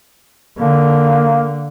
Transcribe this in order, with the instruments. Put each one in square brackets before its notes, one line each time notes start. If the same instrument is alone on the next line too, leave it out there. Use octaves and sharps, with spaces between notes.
[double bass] D3 [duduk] A#3